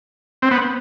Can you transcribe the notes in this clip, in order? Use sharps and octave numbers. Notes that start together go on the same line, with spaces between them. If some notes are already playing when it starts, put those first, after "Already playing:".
C4
B3